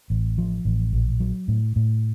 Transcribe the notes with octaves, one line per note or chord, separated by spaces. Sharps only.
A1
F3
A1
A#1
F#3
A2
A2